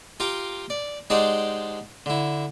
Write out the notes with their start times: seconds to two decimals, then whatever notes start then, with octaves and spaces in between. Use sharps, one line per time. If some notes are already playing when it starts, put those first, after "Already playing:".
0.20 F4 G4 A#4 F5
0.70 D5
1.10 G#3 D#4 G4 C5 D5 F#5
2.06 D3 E4